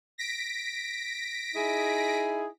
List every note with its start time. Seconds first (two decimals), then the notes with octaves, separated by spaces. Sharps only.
0.18 A#6 B6 D7
1.55 D#4 E4 G#4